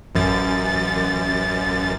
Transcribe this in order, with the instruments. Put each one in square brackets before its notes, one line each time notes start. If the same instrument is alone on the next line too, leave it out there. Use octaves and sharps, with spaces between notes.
[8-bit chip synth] A1 F#2 A6